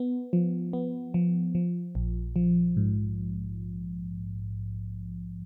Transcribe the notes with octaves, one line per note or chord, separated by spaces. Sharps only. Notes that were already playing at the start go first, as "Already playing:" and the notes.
Already playing: B3
F3
B3
F3
F3
A#1
F3
G#2